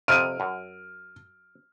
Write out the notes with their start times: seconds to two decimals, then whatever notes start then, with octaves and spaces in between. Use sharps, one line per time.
0.08 F2 C3 F3 F6 D7 D#7
0.40 F#2